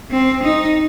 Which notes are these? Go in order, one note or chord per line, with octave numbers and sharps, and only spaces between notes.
C4
D#4